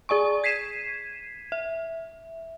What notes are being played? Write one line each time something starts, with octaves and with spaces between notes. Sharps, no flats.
G#4 D5 G#5 C#6
G#6 B6 C7 D#7 E7
E5